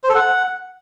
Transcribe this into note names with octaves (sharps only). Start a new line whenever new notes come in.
C5
A4
F#5